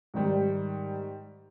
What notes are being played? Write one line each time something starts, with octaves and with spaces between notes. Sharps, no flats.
G#2 D#3 G3